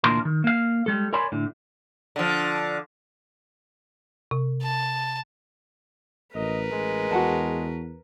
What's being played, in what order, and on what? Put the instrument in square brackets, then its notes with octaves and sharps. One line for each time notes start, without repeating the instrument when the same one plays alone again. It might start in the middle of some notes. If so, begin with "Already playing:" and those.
[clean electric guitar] D2 A#2 E3 D4 A#4 C6
D#3
A#3 F5
G3 G#3 A4
A#4 C#5 D5 G#5 B5 C6
A2 D3
[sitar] D3 F3
[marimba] C3
[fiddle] A5
[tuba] A1 [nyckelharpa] A#4 B4 [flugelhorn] D#5
[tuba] A1 [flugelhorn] G#3
[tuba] E2 [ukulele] F#4 F#5 A5